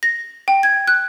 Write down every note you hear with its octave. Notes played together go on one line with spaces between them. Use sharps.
A#6
G5
G#6
F#6